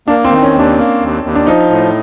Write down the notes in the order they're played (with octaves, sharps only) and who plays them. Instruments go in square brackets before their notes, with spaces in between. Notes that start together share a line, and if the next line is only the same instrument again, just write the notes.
[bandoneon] A#3 [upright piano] D4
[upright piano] C4
[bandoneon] D#3
[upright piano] C#4
[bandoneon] D#2
[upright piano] D4
[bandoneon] A#3
D#2
D#2
[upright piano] D4
[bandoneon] F3 [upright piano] D#4
[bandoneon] A2